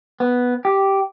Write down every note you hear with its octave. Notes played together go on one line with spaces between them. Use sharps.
B3
G4